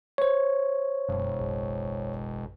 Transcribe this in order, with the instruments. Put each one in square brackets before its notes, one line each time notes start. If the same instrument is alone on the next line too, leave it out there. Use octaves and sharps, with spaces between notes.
[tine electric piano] C5 C#5
[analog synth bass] E1 [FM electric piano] F#2
[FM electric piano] A1 F#2